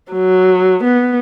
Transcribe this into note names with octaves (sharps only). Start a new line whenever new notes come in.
F#3
B3